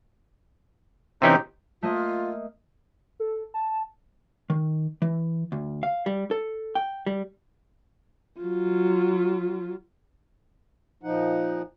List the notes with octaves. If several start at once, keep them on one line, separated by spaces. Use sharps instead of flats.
C3 E3 C#4 D#4 G4
A3 A#3 F4 D#5
A4
A5
D#3
E3
D2
F5
G3
A4
G5
G3
F#3 F4
A#2 F3 D#4 F#5